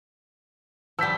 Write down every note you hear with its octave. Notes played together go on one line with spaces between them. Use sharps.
F3 G3 E6 G6 B6